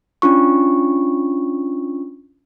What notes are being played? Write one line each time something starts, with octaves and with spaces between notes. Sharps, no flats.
C#4 D4 F4 C#6